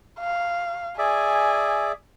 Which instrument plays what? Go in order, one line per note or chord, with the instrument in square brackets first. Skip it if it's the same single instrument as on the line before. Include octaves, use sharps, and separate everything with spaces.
[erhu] F5
[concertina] G#4 D5 E5 [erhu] G#5